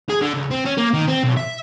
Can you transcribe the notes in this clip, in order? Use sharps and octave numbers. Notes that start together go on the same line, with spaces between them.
G#4
D3
C#2
C4
C#4
A#3
D#3
C4
B1
E5